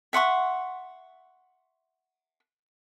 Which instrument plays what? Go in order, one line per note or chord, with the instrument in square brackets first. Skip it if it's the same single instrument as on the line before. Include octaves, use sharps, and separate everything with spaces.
[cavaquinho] E5 F#5 C6 C#6